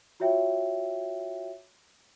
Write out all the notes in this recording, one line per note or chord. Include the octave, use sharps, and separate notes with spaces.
F4 F#4 C#5 E5 G5